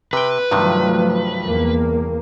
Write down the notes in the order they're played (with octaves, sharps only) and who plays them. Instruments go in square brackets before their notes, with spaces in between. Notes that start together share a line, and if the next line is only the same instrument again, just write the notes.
[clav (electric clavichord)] C3 G5 [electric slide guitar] B4
[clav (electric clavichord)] G2 C3 D#3 [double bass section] F3 F#3 A3
[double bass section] E2 A#3